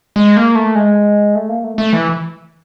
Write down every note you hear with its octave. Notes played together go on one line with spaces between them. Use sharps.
G#3
A#3
A3
G#3
A3
A#3
A3
A3
E3